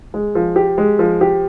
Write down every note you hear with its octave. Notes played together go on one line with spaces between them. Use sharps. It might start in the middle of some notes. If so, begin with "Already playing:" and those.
G#3
F3
G4
G#3
F3
G4